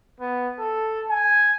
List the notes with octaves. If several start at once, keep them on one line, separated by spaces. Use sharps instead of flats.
B3
A4
G#5